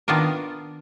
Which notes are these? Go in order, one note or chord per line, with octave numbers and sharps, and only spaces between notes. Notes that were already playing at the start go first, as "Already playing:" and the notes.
D#3 B3 D4 F4 A#4